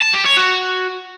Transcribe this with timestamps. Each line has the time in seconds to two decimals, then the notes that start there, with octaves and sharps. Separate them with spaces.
0.02 A5
0.14 G4
0.26 C#5
0.37 F#4